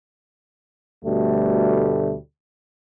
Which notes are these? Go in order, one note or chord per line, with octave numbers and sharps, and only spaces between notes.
D2 B2 G3 A3